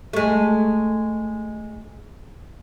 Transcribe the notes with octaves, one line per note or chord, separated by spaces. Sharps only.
G#3 A3